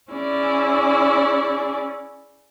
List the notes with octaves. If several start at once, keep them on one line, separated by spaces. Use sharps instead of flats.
C#4 E4 G#4 D5